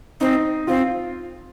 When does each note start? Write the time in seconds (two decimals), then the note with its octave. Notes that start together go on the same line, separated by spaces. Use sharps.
0.21 C4 D#4
0.67 C4 F4